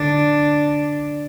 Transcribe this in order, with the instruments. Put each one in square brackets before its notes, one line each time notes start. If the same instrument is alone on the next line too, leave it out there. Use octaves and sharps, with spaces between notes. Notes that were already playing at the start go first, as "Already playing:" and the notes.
Already playing: [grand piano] D3 [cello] D4